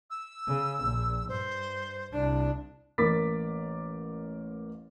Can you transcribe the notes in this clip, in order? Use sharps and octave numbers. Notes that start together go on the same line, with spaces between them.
E6
C#3
A#1
G2 C5
C2 D4
A1 A#3 A#4 D6 A6 B6